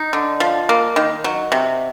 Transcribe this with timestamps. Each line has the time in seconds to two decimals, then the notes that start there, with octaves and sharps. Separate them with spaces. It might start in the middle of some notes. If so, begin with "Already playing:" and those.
Already playing: D#4
0.13 D3
0.40 F3
0.69 A#3
0.96 D#3
1.24 F#3
1.52 C3